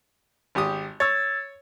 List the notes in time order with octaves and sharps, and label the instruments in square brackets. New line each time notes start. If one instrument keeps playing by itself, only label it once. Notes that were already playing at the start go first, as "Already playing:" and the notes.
[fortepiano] G#1 G4 D#6
[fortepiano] C#5 [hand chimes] E6 G#6 A6